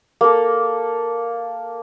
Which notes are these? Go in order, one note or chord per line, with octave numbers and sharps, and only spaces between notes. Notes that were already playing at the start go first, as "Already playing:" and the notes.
A#3 A4